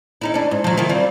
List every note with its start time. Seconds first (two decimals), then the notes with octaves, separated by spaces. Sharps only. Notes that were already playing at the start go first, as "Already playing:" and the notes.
0.21 C#4 D#4 E4
0.34 C#4 D4
0.51 G#2
0.64 F3 F#3
0.77 D#3 F3 E4
0.89 G3 C4 F4